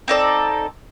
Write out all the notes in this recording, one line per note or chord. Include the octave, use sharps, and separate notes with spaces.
C4 D#4 A4 D5